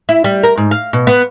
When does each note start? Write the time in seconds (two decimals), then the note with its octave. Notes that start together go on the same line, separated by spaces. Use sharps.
0.09 E4
0.24 G3
0.43 A#4
0.57 G#2
0.71 F5
0.93 B2
1.07 B3